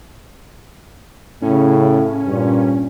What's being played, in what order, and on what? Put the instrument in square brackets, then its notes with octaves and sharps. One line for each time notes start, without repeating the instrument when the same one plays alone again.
[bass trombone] A2 [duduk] C#3 [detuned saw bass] C#4
[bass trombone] G2 [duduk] A#2